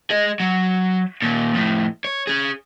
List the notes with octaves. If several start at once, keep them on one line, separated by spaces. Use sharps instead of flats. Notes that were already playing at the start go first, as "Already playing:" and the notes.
G#4 D#5
F#3
D#2 A#2
F2 A2
C#5
C#4 G#4